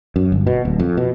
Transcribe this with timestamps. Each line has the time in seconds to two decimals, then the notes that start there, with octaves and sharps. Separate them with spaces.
0.16 F#2
0.32 G1
0.47 B2
0.65 D1
0.80 F2
0.97 B2